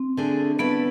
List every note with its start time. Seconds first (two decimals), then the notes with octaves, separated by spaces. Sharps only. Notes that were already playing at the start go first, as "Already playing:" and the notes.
Already playing: C4
0.17 D3 A3 D4 G#4
0.59 D3 A3 B3 E4 B4